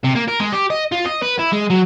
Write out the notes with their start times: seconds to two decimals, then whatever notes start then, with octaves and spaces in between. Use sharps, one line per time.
0.04 C3
0.15 A#3
0.28 A#4
0.40 G#3
0.53 G4
0.70 D#5
0.92 F4
1.06 D#5
1.23 B4
1.39 E4
1.53 G#3
1.70 F#3